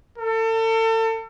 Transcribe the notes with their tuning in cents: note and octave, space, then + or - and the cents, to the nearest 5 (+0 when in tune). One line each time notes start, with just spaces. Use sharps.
A4 +35